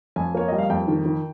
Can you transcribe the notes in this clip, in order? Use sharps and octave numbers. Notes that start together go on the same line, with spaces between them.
F2 G#5
A#3 C#5
G3 D#5
F5
F2 G5
D#3
D#3